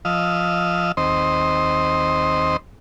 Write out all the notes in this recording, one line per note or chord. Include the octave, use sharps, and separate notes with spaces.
F3 D#5 F5 E6
D#2 C4 C5 D#5